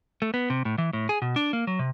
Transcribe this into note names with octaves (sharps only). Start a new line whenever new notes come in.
A3
B3
C3
A2
E3
A2
G#4
B2
D4
A#3
F#3
C3